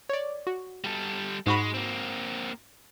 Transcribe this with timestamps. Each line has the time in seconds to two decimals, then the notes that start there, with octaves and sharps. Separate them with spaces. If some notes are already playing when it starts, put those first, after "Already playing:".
0.09 C#5 D5
0.47 F#4
0.84 G3 A4
1.46 G#2 G#3 F#4 B5
1.74 A#3 C4